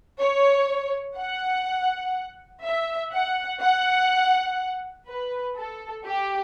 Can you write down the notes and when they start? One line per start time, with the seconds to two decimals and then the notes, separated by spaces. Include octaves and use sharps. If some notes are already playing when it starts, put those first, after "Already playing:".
0.19 C#5
1.17 F#5
2.63 E5
3.12 F#5
3.61 F#5
5.08 B4
5.57 A4
6.05 G4